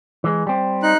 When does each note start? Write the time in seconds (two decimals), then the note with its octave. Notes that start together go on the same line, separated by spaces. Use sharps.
0.24 E3 G#3
0.47 G3 C4
0.83 D#4 F#6